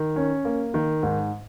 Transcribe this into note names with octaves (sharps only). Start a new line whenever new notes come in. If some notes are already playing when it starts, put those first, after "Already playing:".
Already playing: D#3
C#4
A#3
D#3
G#2